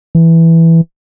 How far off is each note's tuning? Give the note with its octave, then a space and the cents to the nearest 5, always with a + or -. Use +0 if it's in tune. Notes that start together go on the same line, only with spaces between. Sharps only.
E3 +0